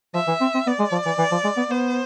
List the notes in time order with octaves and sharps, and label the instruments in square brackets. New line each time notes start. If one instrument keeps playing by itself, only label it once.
[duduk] F3 [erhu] E5
[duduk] E3
C4
C4
[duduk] B3 [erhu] D5
[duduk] G#3
F3
E3
E3
F3
G#3
B3
[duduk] B3 [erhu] C5